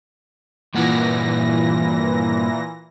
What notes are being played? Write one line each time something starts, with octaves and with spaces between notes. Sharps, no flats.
G2 A#2 E3 A#3 F#5 A#6